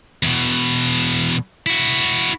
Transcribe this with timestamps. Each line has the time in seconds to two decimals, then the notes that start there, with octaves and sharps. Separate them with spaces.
0.23 E2 B2
1.66 E4 F#4